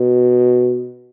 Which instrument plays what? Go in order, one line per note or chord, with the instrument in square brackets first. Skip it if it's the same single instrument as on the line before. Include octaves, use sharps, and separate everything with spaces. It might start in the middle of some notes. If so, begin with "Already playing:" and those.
Already playing: [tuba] B2